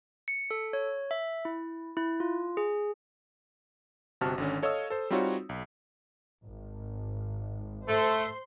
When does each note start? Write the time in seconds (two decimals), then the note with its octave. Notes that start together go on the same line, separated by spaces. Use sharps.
0.28 C#7
0.51 A4
0.73 C#5
1.11 E5
1.45 E4
1.97 E4
2.20 F4
2.57 G#4
4.21 G1 C3 F#4 A5 F6
4.38 G#1 D3 C#4
4.63 A4 C#5 D#5 F5 D#6 E6
4.90 A4 C5
5.10 G3 C4 D#4 F4 F#4 C#5
5.49 B1
6.44 G#1
7.89 A3 C5 C6